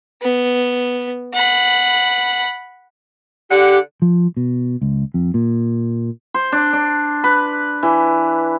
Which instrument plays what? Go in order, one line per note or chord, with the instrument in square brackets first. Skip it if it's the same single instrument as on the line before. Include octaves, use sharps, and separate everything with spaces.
[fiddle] B3
F#5 B5
[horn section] D3 F#5 [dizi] G4
[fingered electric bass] F3
B2
C#2
F2
A#2
[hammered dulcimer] C5
D4
D4
B4
E3